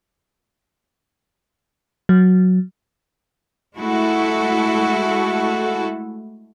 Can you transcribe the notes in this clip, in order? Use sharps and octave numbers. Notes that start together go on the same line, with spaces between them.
F#3
G#3 A3 E4 F#4 A4